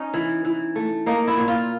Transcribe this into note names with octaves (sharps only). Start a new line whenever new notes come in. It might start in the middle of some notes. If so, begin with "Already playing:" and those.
Already playing: C#4 D#4
E3
E3
A3
A#3 D#4
E4
A#2
F4